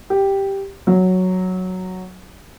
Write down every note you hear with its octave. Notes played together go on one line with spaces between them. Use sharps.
G4
F#3